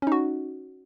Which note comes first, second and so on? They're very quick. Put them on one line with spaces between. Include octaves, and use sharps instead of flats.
C#4 D#4 F#4